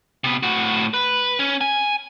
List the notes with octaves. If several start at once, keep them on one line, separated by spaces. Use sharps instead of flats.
C3 B3
A2 F#4
B4
C#4
G#5